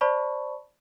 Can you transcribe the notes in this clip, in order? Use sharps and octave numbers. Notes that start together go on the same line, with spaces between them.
C5 D5 A5 B5 C#6